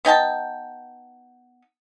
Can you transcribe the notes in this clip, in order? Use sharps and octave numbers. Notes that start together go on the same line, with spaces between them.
B3 D#4 G5 A5